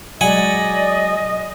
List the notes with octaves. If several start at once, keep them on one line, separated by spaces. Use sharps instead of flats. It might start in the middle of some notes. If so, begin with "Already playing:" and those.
F#3 G#3 D5 D#5 F#5 G#5 B5